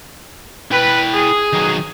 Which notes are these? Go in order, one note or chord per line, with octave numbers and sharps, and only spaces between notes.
E4 B4 G5
G#4
D#3 F#3